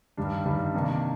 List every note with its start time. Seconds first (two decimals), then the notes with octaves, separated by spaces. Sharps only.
0.17 G2 D#3 G3 D4
0.45 G2 D#3 G3 D4
0.73 C3 D#3 A#3 D4